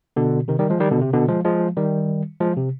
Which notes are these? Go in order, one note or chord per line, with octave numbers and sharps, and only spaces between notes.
B2 D3
C3 D#3
D#3 G3
F3 G#3
D#3 G3
B2 D3
C3
B2 D3
F3 G#3
F3 G#3
D#3 G3
F3 G#3
C3